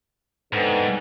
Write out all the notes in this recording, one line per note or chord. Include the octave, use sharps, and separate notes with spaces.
G#2 D3 B3 C4